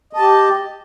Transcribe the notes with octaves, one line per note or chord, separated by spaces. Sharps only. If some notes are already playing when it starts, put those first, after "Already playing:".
G4 D#5 A5